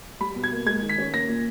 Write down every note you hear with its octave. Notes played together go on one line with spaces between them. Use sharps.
G3 B5
B2
G#6
A#3
G#3 G#6
D#3
B6
C#4
A#3 A#6
A#2